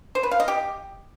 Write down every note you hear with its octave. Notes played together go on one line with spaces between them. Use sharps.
C5
B4
F5
D#5
G4